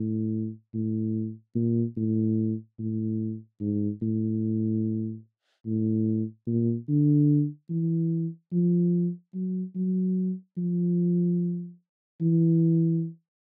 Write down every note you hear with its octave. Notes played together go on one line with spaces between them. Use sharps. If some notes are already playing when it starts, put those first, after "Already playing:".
Already playing: A2
A2
A#2
A2
A2
G#2
A2
A2
A#2
D3
E3
F3
F#3
F#3
F3
E3